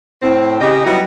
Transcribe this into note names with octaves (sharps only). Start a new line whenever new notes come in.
A2 C4
C#3 G4 D#5
F#3 G3 B3 D#4 E4 F#4